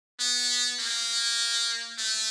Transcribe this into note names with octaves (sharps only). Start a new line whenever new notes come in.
B3
A#3
A3